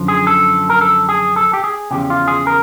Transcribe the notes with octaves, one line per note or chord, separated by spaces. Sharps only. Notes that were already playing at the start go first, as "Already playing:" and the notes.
Already playing: F#2 D3 F3
G#4
A4
A#4
A4
G#4
A4
G4
G#4
E2 C#3 F3 G4
F4
G#4
A#4